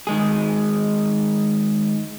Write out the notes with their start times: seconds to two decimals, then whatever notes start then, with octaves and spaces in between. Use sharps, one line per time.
0.07 D#3 G#3 G#4